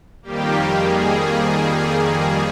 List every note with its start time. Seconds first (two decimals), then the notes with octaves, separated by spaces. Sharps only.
0.22 F2 D#3 G3 A#3 G4
0.78 G#4